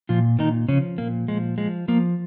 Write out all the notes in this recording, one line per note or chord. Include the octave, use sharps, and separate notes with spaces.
A#2 F3 F4
A#2 D#3 D#4
C#3 F3 C#4
A#2 A#3
F3 G#3
F3 G#3
F3 A#3